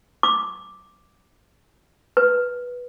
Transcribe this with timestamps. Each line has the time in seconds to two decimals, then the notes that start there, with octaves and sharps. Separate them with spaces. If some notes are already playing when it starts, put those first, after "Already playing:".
0.23 D6
2.17 B4